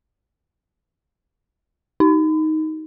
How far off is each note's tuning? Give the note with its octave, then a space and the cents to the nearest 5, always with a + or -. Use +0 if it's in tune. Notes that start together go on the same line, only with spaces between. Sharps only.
D#4 +10